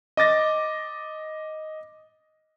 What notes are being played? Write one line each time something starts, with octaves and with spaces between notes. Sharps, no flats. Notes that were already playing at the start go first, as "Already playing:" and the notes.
D#5 D6 A6 A#6